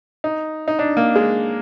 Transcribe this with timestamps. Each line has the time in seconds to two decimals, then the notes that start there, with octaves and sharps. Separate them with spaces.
0.24 D#4
0.68 D#4
0.79 D4
0.97 A#3
1.15 G#3